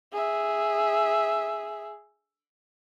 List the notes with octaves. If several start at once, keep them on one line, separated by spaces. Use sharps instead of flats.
G#4 E5